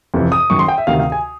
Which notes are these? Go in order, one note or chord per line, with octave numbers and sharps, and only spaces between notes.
F2 C3 E3
D#6
F#2 D#3 C#6
C6
G5
E5
D2 C3 D#3 F5
F5
G#5